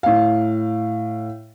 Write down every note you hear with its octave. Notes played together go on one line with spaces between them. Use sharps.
A2 F5